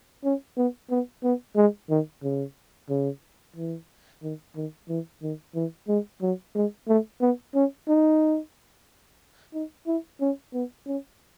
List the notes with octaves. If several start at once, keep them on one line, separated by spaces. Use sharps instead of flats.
C#4
B3
B3
B3
G#3
D#3
C#3
C#3
E3
D#3
D#3
E3
D#3
E3
G#3
F#3
G#3
A3
B3
C#4
D#4
D#4
E4
C#4
B3
C#4